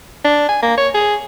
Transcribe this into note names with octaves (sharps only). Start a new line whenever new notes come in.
D4
G#5
A#3
C#5
G#4